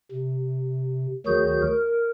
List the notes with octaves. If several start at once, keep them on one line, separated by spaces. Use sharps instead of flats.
C3
D2 D#3 F#3 F#4 G#4 G6
A#4